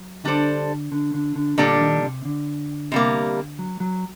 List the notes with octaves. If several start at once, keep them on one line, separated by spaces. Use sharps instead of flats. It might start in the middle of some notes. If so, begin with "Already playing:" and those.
Already playing: F#3
D3 G3 D4 A4 C5
D3
D3
D3
A#2 D3 G3 D4 A4
D#3
C3
D3
C3 G3 A#3
F#3
F#3